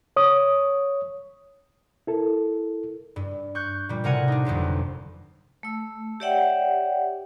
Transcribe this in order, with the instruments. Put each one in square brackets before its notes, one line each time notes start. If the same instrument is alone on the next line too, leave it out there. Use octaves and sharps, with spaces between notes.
[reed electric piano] C#5 D#6
E4 A4 A#4
[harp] G2
C#6 F#6 G6
A#2 G3
A2 C3 A#4 F#5 G#5
D4 D#4
G1 F2 C3 F#3
[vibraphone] A3 E6
G4 C#5 D5 E5 F#5 G5